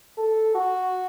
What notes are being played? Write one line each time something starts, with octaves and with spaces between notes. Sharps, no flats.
A4
F#4